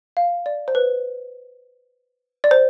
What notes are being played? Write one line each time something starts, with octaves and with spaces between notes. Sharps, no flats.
F5
D5
C5
B4
D5
C5